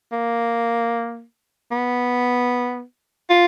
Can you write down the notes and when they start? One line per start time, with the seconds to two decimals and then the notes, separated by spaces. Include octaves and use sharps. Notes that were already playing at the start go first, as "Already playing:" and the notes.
0.12 A#3
1.71 B3
3.30 F4